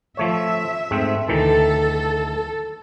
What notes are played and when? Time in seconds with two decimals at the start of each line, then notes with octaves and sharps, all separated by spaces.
0.17 F3 A3 C#5 E5
0.91 G#2 A3 C4
1.28 D2 D#3 E3 A4